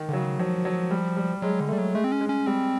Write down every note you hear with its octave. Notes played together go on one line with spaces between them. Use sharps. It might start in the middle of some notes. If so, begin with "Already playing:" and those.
Already playing: D#3
D3
C#3 F#3
F3 F#3
F#3
G3
G3
F#3 G#3
D3
G3 A3
F#3
G#3 A3
C4
C#4
G#3
C#4
G3 C4